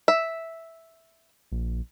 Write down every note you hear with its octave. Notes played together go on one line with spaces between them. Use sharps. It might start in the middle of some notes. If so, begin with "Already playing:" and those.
E5
A#1